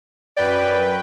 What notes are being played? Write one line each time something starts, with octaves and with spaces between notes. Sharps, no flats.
F#2 B4 D5 G5